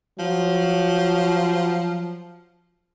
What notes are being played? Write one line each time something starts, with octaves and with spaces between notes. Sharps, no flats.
F3 F#3